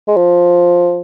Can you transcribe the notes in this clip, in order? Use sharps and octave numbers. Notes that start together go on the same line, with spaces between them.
G#3
F3